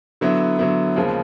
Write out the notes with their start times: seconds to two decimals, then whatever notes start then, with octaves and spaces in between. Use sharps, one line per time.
0.21 D3 F#3 B3 E4
0.59 D3 F#3 B3 E4
0.96 D#2 C#3 F3 G#3